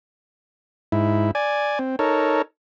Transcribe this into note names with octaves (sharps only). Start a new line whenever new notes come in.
G#2 E4
D5 G#5
C4
D#4 A4 A#4 C#5